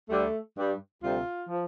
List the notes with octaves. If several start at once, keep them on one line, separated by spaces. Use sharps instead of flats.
D2 D3 G3 A3
G2 G3
D2 C3 G3 F4
F3